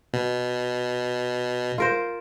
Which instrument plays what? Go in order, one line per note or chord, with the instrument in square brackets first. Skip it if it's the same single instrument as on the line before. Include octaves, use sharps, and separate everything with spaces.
[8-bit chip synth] B2
[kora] F4 A#4 C5